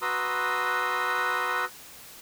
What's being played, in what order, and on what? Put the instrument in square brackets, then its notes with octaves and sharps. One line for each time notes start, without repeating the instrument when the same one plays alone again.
[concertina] F#4 B4 A#5 C6 D#6 E6